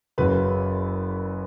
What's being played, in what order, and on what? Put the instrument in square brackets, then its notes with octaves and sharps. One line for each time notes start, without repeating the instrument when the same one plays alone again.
[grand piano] F#1 F#2 C#3 F#3 B4